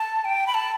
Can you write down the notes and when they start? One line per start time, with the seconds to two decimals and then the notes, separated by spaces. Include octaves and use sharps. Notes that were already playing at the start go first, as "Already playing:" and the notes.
Already playing: A5
0.25 G5
0.47 B5
0.54 A5